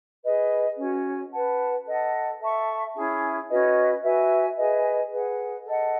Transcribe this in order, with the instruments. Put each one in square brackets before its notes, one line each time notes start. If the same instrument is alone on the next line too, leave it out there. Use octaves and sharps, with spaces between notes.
[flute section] G#4 B4 D#5
C#4 F#4 C#5 G#5
B4 F#5 A5
A4 D#5 F#5
A4 E5 A5 C#6
C#4 E4 G#4
C#4 F#4 B4 D#5
F#4 B4 E5 G#5
G#4 B4 D#5 G#5
G#4 B4 F#5
A4 D#5 F#5